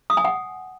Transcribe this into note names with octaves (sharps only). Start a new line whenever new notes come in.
D#6
G#5
F#5